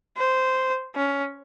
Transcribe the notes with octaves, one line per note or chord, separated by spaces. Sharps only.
C5
C#4